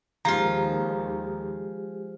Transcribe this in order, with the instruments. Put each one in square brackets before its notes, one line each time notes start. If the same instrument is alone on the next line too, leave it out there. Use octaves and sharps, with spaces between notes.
[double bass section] D#2 [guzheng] F3 F4 [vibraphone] G#3 G4 G#4 [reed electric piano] A#5